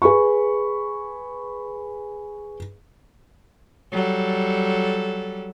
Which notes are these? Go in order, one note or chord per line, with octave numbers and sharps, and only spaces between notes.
G#4 B4 B5 C#6
F#3 G3 A4